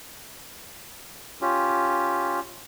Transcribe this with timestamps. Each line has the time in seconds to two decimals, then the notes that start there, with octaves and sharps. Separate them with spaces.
1.41 C#4 F4 G4